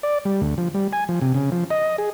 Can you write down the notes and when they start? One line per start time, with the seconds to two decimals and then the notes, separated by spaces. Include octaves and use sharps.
0.03 D5
0.25 G3
0.41 D2
0.58 F3
0.74 G3
0.93 G#5
1.09 F3
1.21 C3
1.34 C#3
1.52 F3
1.70 D#5
1.98 G#4